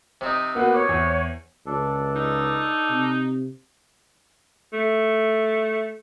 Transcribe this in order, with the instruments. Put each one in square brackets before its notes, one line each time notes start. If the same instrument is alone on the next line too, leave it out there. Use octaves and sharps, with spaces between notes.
[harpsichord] C3 C4 D#4
[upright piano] A#3 B3 F#4 [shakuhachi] F#5
[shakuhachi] C#5 [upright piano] D6
[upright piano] E2
[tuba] C#2 [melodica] D4 A4
[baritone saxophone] D#4
[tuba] C3
[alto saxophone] A3